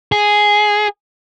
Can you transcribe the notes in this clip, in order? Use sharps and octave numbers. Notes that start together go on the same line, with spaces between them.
G#4